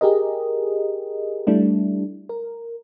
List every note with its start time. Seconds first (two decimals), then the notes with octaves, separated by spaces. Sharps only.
0.01 G4 G#4 A#4 D#5
1.47 G3 A3 D4 E4
2.29 A#4